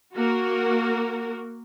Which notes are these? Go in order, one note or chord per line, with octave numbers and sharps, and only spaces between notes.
A#3 F#4 A#4